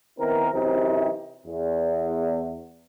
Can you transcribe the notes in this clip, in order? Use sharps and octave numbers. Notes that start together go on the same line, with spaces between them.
D#3 B3 C4 E4 A#4
F#2 C3 E3 C4 D#4 G4
E2